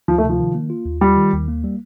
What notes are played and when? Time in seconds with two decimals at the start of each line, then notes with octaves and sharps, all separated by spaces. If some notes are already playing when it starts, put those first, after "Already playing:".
0.08 D2 F3
0.18 A3
0.24 C3
0.29 F3
0.40 D#3
0.54 A#3
0.70 F4
0.85 D#2
1.01 G3 F4
1.17 D#3
1.32 D#2
1.48 A#3
1.64 G3